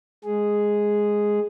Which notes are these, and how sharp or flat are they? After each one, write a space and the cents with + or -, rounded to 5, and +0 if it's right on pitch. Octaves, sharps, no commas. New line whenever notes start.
G#3 +0 G#4 +0